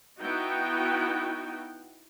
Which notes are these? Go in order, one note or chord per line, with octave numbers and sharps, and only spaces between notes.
B3 D#4 E4 F#4 G5